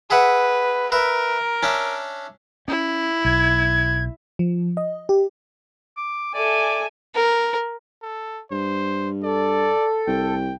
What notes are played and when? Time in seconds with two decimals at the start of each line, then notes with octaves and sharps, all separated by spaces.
0.10 G#4 B4 E5 F#5
0.92 A#4 B4 E5
1.63 C#4 D4 E5
2.68 C#4 E4
3.25 B1 G#6
4.39 F3
4.77 D#5
5.09 G4
5.97 D6
6.34 A4 D5 E5 G#5
7.15 A#4
8.02 A4
8.51 G2 C5
9.23 A4 D5
10.07 C2 G5